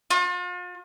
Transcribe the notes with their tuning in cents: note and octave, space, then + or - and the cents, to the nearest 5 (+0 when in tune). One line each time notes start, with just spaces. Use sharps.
F4 +40